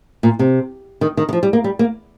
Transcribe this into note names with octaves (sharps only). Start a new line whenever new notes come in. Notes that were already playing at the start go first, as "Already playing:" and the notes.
A#2
C3
D#3
D#3
D#3
F3
G3
A#3
G3
A#3